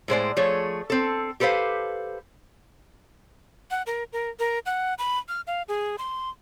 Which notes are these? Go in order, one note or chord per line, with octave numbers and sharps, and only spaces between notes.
A2 G#3 C5 D5
F3 A3 G#4 C#5
C4 A4
G4 A4 B4 C5 F5
F#5
A#4
A#4
A#4
F#5
B5
F6
F5
G#4
C6